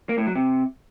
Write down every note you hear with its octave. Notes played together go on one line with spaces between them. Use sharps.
A#3
A2
F#3
C3